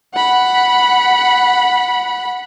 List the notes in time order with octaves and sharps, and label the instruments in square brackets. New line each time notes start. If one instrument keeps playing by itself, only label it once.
[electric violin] F#5 B5